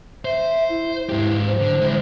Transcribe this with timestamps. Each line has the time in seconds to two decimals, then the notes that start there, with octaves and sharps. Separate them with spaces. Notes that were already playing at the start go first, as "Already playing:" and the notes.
0.25 C5 E5
0.69 E4
1.09 G#2 G4
1.47 C5
1.60 D3
1.81 G#3 E4